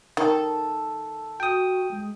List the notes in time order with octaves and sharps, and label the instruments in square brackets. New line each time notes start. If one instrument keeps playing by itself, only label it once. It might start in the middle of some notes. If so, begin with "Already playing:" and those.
[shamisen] D#3 [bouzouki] A4
[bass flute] F#4 [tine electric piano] G5 D#6
[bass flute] G#3